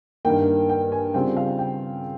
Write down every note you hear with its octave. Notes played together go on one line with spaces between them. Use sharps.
G2 D#3 A#3 G5
G5
G#5
C#3 G3 C4 F4 G5
F5
G5